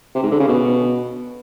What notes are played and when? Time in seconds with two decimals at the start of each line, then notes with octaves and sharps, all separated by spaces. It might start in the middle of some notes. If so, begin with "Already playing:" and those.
0.15 C3
0.23 G#2
0.31 D3
0.40 C#3
0.48 B2